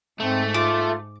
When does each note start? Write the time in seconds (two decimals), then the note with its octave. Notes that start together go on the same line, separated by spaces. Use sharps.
0.20 G#2 A3 C4
0.54 F4 D6